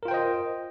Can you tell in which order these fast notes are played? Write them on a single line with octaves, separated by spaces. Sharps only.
A#4 F4 G5 C5 D#5